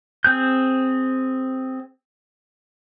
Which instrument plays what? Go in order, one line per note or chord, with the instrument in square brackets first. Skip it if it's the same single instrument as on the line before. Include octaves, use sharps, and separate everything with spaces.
[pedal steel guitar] C4 G#4 G6